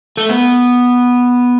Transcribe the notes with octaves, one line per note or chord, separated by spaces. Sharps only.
A3
B3